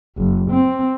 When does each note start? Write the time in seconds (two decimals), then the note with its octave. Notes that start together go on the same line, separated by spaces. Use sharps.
0.18 F#1
0.50 C4